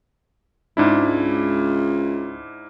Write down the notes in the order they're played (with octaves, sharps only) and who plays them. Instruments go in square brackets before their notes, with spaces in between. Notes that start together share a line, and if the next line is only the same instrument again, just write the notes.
[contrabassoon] C#2 [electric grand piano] G#2 D4 E4